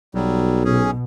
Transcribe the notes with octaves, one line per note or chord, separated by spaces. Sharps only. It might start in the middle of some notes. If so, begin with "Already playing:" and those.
B1 F#3 G3
B2 C#4 G#4